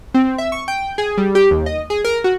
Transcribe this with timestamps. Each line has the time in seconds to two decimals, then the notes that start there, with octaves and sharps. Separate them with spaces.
0.14 C4
0.38 E5
0.52 C#6
0.68 G5
0.98 G#4
1.18 G3
1.35 G4
1.51 D#2
1.66 D#5
1.90 G#4
2.05 A#4
2.24 F#4